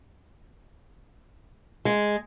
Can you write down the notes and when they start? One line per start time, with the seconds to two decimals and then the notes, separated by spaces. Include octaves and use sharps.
1.85 G#3